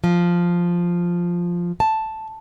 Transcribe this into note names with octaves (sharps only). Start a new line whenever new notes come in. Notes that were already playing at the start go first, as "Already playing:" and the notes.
F3
A5